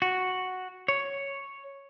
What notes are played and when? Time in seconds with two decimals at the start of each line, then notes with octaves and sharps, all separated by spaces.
0.02 F#4
0.88 C#5